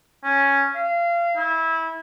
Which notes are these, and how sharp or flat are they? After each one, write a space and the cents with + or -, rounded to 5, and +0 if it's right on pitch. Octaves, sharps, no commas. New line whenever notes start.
C#4 +0
F5 -25
E4 -20